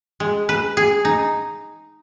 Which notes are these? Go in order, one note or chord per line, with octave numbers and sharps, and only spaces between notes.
G#3
B4
G#4
D#4